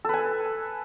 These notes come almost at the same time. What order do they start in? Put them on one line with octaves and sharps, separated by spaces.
A4 B4 G#5